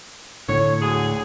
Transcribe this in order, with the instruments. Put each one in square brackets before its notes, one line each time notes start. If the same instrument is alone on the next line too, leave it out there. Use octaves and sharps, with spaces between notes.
[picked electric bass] A2 D3 [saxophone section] C#5
[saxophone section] D2 F#3 G#4